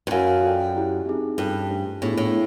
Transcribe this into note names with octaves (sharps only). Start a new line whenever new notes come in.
G2
F#2 F#4 A#4 C#5 F5 G#5
F4 A4 D5 G5
C#4 E4 G4
C4 D#4 G#4
G2 C#4 F4 A4
A3 D4 G4 C5
A2 B3 D4 F4 G#4
A2